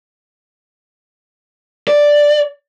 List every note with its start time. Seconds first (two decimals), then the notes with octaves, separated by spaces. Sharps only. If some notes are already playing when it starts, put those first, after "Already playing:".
1.88 D5